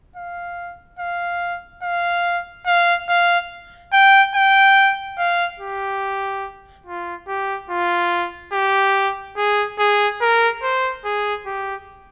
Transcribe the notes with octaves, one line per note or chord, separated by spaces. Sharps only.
F5
F5
F5
F5
F5
G5
G5
F5
G4
F4
G4
F4
G4
G#4
G#4
A#4
C5
G#4
G4